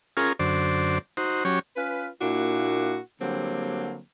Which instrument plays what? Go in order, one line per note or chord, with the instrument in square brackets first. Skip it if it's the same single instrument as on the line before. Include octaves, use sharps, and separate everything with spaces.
[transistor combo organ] C#4 F4 G#4 A#4
F#2 D3 C5 D5
D#4 F#4 C5
F#3 C#4 G4 C#5
[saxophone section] C#4 F4 B4
A#2 A#3 D4 E4 F#4
D3 F#3 G3 A#3 C4